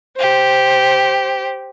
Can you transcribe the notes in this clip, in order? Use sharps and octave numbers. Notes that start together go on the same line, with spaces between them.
G4 C5